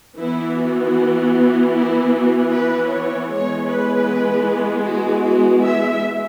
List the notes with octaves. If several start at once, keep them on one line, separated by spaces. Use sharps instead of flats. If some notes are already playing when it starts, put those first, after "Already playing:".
E3 B3 E4
F#4
E4
F#4
B4
C#5
E3 G#3 B3 C#5
B4
F#4
F#4
E5